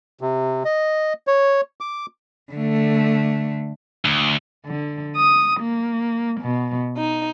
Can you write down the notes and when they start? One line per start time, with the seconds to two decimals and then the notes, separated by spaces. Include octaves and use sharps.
0.21 C3
0.65 D#5
1.27 C#5
1.81 D6
2.53 D3 A3
4.05 D2
4.66 D3
5.16 D#6
5.60 A#3
6.40 B2
6.97 D#4